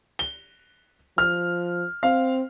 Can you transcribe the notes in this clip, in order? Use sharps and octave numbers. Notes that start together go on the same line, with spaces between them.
G7
F3 F6
C4 F5